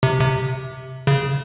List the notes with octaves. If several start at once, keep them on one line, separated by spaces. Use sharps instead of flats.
C3
C3
C#3